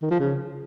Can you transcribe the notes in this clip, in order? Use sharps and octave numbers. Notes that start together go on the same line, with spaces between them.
D#3
F3
C#3